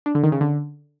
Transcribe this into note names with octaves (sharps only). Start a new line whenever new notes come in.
D4
D3
D#3
C#3
D3